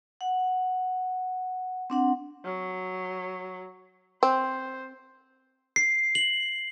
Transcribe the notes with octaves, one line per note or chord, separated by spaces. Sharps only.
F#5
C4 D4 F#5
F#3
C4 C5
C7
F#7